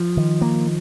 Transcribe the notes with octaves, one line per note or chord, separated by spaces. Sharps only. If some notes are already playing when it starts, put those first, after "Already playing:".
Already playing: F3
D#3
A#3